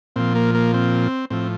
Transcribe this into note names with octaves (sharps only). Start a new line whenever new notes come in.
A#2 F3 C4
A#3
A#3
C4
A2 F3 C4